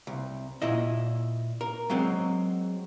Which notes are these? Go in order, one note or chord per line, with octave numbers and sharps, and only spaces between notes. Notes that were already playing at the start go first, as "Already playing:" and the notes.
C2
A#2 E4 D#5
A#4
F#3 G#3 C4